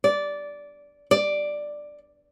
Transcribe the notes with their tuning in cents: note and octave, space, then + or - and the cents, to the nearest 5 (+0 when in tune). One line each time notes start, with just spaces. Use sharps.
D5 -15
D5 +5